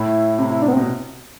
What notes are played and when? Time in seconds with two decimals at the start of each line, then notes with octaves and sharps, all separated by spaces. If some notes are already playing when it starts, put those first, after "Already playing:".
Already playing: A2 E4
0.38 C3 E4
0.50 E4
0.62 D4
0.68 B3
0.73 C4
0.77 B2